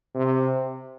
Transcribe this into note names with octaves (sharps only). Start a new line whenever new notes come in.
C3